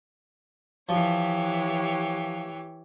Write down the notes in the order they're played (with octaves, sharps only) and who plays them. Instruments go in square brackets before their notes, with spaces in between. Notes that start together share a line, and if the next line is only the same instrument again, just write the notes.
[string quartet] E3 G4 C#5 [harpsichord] F3